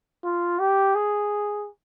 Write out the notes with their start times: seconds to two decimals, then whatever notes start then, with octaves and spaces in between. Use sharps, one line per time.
0.24 F4
0.59 G4
0.95 G#4